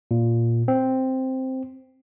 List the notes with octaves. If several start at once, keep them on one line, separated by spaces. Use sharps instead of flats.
A#2
C4